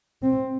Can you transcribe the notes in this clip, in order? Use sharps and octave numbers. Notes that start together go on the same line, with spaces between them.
C4